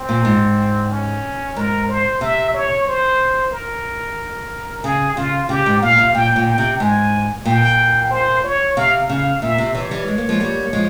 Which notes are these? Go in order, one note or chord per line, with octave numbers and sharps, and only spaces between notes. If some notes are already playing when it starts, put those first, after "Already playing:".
Already playing: C4
A#2
G#2
C#4
G#2 A#4
C5
C3 E5
C#5
C5
A#4
C#3 G#4
C#3 F4
C#3 G4
G#2
A#2 F5
C3
A#2 G5
A#2
G5
C3
G#2 G#5
A#2 G5
C5
C#5
C3 F5
C#3 F5
A#2 E5
C3
C3 E3 C#5
E3 G3
G#3
A#3
F3 G#3
G3 A#3
F3 G#3